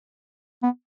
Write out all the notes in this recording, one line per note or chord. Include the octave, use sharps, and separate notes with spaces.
B3